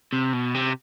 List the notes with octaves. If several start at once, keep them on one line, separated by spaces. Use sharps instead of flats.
C3
B2
C3